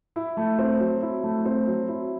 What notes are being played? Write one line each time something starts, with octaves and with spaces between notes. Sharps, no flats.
E4
A3
C4
F#3
E4
A3
C4
F#3
E4